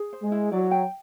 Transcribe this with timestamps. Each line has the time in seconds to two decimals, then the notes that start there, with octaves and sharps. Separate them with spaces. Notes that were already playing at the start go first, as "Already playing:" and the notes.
Already playing: G#4
0.13 C5
0.22 G#3
0.32 E4
0.52 F#3 D5
0.71 G5